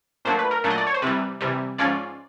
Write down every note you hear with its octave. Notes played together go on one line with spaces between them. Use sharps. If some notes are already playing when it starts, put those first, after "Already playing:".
A#2 F#3 A3 D4 C5
B4
A#4
A#2 F#3 A3 D4
D#5
D5
C#5
C5
C3 E3 G3 B4
C3 E3 G3
G#2 F3 G#3 C#4 F4 D5